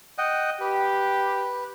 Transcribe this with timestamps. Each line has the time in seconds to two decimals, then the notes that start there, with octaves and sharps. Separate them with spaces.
0.18 D#5 F#5 G5
0.61 G4 B4